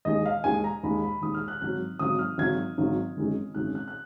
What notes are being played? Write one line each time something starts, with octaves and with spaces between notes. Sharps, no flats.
D#2 D#3 G#3 D#5
F5
D#2 D#3 G#3 G#5
A#5
D#2 D#3 G#3 B5
B5
D#2 D#3 G#3 D#6
F6
F#6
G#1 G#2 F#3 F#6
G#1 G#2 F#3 D#6
F6
G#1 G#2 F#3 G#6
G#1 G#2 F#3
G#1 F#2 D#3 G#3
G#1 F#2 D#3 G#3 F#6
F#6
F#6